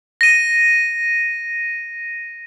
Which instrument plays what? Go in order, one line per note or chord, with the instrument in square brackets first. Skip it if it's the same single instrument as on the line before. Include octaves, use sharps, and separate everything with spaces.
[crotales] A#6 D#7